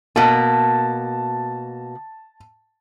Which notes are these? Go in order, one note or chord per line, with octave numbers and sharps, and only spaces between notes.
B2 A#3 A5